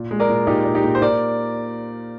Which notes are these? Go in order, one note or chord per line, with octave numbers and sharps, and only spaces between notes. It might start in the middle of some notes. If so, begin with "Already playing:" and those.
Already playing: A#2
G#3
A#4 D5
A#2
A#2 D#4 G4
A#2
D#4 G4
A#2
C5
A#2 A#4 D5